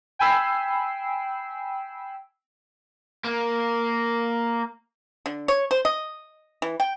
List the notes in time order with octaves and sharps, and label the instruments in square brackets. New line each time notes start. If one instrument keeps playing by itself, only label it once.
[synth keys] G5 G#5 B5 E6 C7
[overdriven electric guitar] A#3
[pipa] D3
C#5
C5
D#5
E3
G5